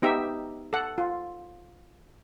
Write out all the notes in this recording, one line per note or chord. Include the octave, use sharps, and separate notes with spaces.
B3 D#4 G4 E5
A4 F#5
F4